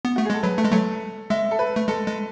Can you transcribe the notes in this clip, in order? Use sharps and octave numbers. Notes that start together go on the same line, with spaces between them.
B3
A3 F#4
G#4
G#3 A4
F#3 B4
A3 A4
G#3
F#3 A3 A4
G#3 E5
A4
B4
A3
G#3 A4
G#3